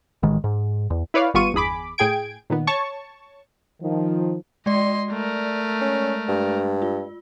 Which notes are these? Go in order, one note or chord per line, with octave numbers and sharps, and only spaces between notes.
A1 D#3 G#3
G#2
E2
E4 B4 C#5 D5 F5
G#1 G3 B3 F4 C#6 D#7
G1 E2 G#4 B5 D6
A2 G#4 G5 G#6 D7
A#2 D#3 B3
C#5 A5 C#6
D#3 F3
G#3 D5 D#5 C6
A3 A#4
C#4
G2
F4